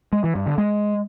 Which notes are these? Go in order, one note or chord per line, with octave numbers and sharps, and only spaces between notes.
G#3
E3
G2
D3
G#3